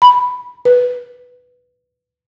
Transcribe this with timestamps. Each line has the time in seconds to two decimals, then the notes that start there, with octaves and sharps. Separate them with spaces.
0.02 B5
0.65 B4